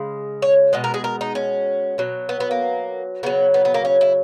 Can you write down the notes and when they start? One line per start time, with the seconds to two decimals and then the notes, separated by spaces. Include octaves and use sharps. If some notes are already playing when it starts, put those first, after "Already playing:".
Already playing: C#3 G#3
0.42 C#5
0.73 B2 G#3 D#5
0.84 A#4
0.94 G#4
1.04 A#4
1.21 D#4
1.35 C#4
1.98 B2 F#3
2.29 B3
2.40 B3
2.51 A#3
3.23 C#3 F#3 B3
3.54 B3
3.65 B3
3.74 A#3
3.85 C#4
4.01 E4